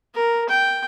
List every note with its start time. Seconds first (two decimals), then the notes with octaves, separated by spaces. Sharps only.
0.14 A#4
0.49 G5